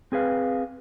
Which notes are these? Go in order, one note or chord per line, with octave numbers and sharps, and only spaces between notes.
C4 G#4 B4 F5